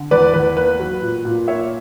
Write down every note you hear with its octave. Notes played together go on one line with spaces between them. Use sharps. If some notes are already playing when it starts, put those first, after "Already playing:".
Already playing: D3
E2 B4 D5
E2 B4
A#3 B4
F#3
A#2
A#2
A#3 C#5 E5